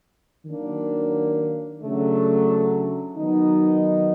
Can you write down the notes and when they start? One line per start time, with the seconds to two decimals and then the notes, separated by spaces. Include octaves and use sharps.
0.46 D#3 F#3 A#3 D4
1.81 C#3 F#3 A3 D4
3.16 D#3 F#3 B3 D#4